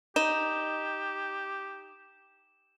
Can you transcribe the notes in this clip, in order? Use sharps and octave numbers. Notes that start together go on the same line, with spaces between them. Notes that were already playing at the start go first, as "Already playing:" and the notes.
D#4 G4 E7